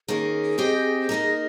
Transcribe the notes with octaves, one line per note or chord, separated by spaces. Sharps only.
D#3 A#3 C#4 G#4
C4 G4 C5 D#5
A#3 D#4 A#4 D#5